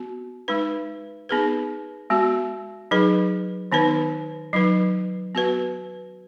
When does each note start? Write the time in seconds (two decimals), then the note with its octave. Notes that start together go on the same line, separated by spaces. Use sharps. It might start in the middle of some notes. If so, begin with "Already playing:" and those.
Already playing: B3 F#4
0.48 G#3 D#4 B4
1.29 B3 D#4 G#4 B4
2.10 G#3 B3 F#4
2.91 F#3 D#4 G#4 B4
3.72 D#3 B3 D#4 B4
4.53 F#3 D#4 B4
5.35 B3 F#4 B4